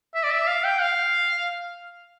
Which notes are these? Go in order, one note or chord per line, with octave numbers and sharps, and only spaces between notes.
E5
D5
E5
F5
G5
F5